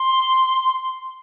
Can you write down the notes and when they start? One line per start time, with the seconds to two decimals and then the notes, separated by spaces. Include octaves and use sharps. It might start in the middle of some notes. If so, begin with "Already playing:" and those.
Already playing: C6